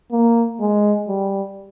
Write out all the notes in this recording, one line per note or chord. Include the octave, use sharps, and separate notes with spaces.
A#3
G#3
G3